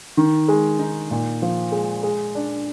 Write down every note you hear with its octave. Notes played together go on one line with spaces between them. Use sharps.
D#3
G#3
D#4
A#2
F3
G#3
G#3
D4